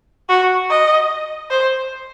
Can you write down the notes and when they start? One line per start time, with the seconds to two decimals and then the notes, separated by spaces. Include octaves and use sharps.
0.29 F#4
0.70 D#5
1.50 C5